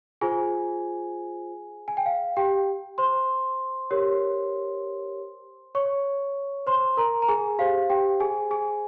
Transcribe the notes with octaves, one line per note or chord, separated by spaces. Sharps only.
F4 G#4 C5 G#5
G#5
G5
F5
G4 G5
C5 C6
G4 A#4 C#5
C#5 C#6
C5 C6
A#4 A#5
A#5
G#4 G#5
G4 C5 F5
G4 G5
G#4 G#5
G#4 G#5